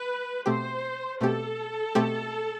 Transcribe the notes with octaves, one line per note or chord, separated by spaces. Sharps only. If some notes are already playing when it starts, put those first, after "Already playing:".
Already playing: B4
B2 A3 C4 G4 C5
B2 A3 C4 G4 A4
B2 A3 C4 G4